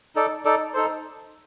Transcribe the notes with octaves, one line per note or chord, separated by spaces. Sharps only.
D#4 A4 D5
D#4 A4 D5
D#4 A4 C5